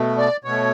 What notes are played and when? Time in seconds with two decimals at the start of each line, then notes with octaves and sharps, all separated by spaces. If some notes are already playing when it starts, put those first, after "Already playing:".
Already playing: B2 A3
0.18 D5
0.44 B2 A3 C#5